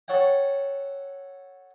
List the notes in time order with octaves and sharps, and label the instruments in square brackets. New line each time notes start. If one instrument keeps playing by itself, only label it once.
[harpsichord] A4 C#5 F#5 G5